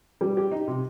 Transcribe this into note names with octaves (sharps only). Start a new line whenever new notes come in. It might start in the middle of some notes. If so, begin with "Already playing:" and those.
G3
G4
D#4
C3